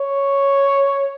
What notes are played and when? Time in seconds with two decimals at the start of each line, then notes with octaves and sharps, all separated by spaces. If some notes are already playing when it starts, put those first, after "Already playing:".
Already playing: C#5